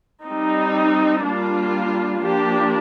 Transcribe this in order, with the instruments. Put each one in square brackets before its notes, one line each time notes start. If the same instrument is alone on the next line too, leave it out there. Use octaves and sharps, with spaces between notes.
[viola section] G3 C4 D#4
G3 A#3 D4 F4
F3 A#3 D4 G4